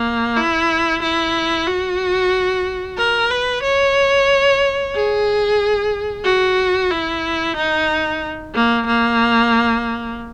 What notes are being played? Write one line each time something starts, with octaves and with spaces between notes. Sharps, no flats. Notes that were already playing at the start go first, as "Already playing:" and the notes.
Already playing: A#3
E4
E4
F#4
A#4
B4
C#5
G#4
F#4
E4
D#4
A#3
A#3